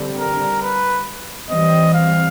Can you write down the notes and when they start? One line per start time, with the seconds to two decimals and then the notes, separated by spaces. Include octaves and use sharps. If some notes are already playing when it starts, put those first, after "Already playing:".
Already playing: D3 G3 C4
0.18 A#4
0.62 B4
1.50 E3 G3 C4 D#5
1.93 F5